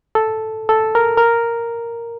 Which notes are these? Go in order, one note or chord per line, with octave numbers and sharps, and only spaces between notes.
A4
A4
A#4
A#4